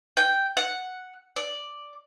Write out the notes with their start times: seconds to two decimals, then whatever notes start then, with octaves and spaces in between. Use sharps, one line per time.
0.17 G5
0.57 F#5
1.36 D5